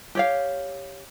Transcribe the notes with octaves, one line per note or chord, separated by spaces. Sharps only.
G4 C#5 F5